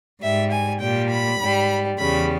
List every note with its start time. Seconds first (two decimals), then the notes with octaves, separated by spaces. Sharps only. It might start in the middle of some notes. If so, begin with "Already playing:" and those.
0.22 G#2 G3 E5
0.51 G#5
0.81 A#2 G3 G5
1.11 B5
1.40 G#2 G3
1.98 E2 C#3 G3 B5